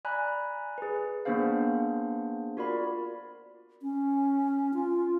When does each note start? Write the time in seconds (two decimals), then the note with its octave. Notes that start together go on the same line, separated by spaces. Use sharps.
0.05 D5 G#5 A#5 B5 F#6
0.78 G#4 B4
1.25 A#3 B3 D4 G#4 C5 F5
2.57 F4 F#4 A#4 D5 B5
3.82 C#4
4.74 F4